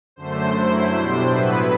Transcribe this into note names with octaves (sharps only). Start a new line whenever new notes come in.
F#2 D3 A3 C5
F#2 F#3 A3 E4 C5
B2 G3 D4
A2 F#3 B3 E4 B4